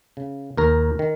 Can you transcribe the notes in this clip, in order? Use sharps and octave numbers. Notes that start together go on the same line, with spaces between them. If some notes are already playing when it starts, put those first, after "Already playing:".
C#3
D#2 A#4
D#3